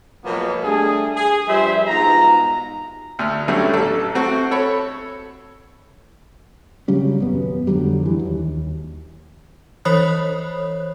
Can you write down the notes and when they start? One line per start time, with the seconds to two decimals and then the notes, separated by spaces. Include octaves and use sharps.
0.25 B2 F3 F#3 G#3 A#3 B3
0.64 G3 A3 D4 G#4
1.16 G#4
1.48 G2 F3 G3 C5 E5
1.88 G#2 B2 F4 A#5
3.19 D2 F6
3.48 D3 F#3 G3 A3 C#4
3.74 A1 A4
4.15 A3 C4 F#4
4.51 A4 C#5 B5
6.88 C#3 F#3 G3 C#4
7.18 D#1 F#2 B3
7.67 F2 D3 F#3 G3
8.03 G2 E3
8.19 D#2
9.85 E3 C5 C#5 B5 D#6 F#6